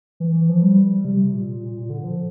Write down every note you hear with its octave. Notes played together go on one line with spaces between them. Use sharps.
E3
F3
G3
C3
C3
A#2
A#2
A#2
A#2
D3
F3